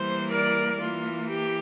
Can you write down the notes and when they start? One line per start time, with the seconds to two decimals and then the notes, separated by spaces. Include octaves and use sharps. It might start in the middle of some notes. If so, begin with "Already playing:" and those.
Already playing: E3 G3 A#3 C5
0.30 A#4 D5
0.79 E3 A#3 F4
1.29 G4